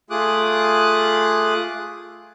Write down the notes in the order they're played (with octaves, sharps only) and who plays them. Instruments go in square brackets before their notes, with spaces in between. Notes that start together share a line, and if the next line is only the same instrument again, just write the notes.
[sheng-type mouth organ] A3 F4 G#4 D6 D#6 F#6